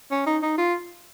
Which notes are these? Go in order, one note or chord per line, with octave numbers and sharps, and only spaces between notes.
C#4
D#4
D#4
F4